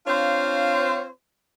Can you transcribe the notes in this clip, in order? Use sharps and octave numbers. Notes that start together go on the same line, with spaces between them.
C4 D4 F4 C5 C#5 F5